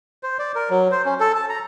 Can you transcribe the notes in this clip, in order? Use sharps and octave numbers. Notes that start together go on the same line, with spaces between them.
C5
D5
A#4
F#3
C5
C#4
A4
A5
A#5